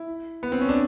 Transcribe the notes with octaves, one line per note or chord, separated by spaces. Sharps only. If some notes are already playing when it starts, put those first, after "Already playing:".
Already playing: E4
B3
C4
C#4
D4